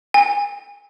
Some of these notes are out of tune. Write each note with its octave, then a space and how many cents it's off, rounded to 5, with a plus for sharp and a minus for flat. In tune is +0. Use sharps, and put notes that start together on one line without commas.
G#5 -30